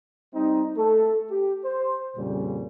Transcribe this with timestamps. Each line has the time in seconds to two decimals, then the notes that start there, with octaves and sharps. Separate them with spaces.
0.34 G3 C4 D#4
0.77 A3 A4
1.30 G4
1.64 C5
2.16 F2 A#2 C#3 G3 C#4